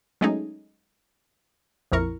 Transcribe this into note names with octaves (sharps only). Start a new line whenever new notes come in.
F#3 G#3 A3 C#4 D#4 G#4
A#1 F2 E4 A#4 C#6